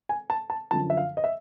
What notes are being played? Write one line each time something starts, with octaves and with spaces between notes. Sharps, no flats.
G#5
A5
A5
F#2 D3 F3 A5
E5
F5
D#5
E5